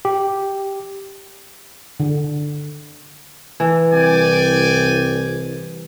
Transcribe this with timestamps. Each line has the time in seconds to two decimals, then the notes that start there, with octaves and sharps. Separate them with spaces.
0.05 G4
2.00 D3
3.60 E3
3.92 C2 D5 G5 G#5